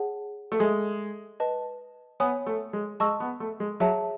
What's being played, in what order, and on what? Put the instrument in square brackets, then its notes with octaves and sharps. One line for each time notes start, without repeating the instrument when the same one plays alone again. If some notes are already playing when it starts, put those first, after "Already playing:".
Already playing: [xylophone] G#4 C#5 F#5 A5
[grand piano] A3
[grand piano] G#3 [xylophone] A4 E5 G#5 D#6
[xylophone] B4 D#5 A5
[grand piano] B3 [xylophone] C#5 G#5 D#6
[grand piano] A3
G#3
[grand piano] G#3 [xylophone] D#5 A5 C#6 E6
[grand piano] B3
A3
G#3
[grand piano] F#3 [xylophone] G#4 C#5 E5 A5